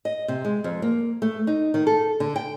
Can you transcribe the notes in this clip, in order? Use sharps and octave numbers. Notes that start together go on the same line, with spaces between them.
D#5
C3
G#3
F2
A#3
A3
D#4
D#3
A4
D3
G5